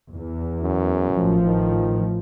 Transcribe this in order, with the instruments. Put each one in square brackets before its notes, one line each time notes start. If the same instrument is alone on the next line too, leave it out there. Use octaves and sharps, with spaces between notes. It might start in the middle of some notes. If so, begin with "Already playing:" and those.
[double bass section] E2
[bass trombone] F#2
[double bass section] A1 A2 F3
[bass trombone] D#3